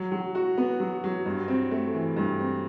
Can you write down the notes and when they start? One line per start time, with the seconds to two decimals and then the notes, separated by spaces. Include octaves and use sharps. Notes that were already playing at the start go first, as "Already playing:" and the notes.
Already playing: F#3
0.12 F#3
0.35 F#4
0.58 B3
0.80 F#3
1.04 F#3
1.26 G2
1.48 C4
1.71 A3
1.94 E3
2.16 G2
2.39 C4